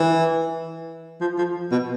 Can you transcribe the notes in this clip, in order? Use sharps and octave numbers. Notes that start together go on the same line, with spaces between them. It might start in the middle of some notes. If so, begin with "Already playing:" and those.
Already playing: E3
F3
F3
B2